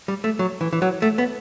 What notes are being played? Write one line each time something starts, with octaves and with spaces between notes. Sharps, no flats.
G3
A3
F#3
E3
E3
F#3
A3
B3